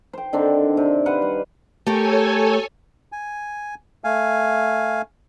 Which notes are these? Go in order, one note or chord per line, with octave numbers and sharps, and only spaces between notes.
C5 G5
D3 D#3 C4 D4
C3
B4 C5 F5 F#5
G3
A3 G4 A4 A#4 C#5 G#5
G#5
A3 F5 G#5